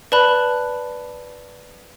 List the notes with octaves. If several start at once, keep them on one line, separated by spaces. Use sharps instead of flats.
B4 D5 A5 B5 F#6